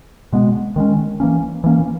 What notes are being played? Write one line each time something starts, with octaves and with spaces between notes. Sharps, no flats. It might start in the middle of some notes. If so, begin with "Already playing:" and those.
B2 G#3 B3
D#3 G#3 C#4
E3 A#3 C#4
E3 A#3 C#4